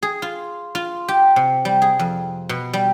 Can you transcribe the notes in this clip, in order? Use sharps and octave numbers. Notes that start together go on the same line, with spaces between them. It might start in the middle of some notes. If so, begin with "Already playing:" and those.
G#4
F4
F4
G4
C3
G3
G#4
F2
B2
G3